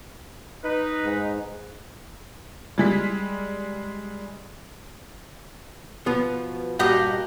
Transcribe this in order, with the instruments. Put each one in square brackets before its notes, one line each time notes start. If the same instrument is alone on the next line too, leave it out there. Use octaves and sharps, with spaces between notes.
[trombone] D#4 [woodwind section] B4
[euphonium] G#2
[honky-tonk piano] G3 G#3 B6
[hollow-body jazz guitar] B2 F3 B3
[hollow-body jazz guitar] G2 A#2 [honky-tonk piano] F#4 [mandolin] G4 D#5 G6